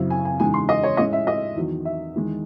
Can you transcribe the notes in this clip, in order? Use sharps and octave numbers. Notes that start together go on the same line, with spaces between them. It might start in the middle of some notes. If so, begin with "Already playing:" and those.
Already playing: F#2 C#3 F#3 C4 E4
G#5
G#5
E2 C#3 G#3 D#4 G#5
C6
D#5
C#5
A2 G#3 C#4 E4 D#5
E5
D#5
E2 D#3 F#3
E5
E2 D#3 G#3